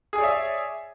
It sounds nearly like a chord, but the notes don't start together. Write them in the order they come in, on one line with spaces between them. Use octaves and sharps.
G#4 G#5 D5 C#5 E5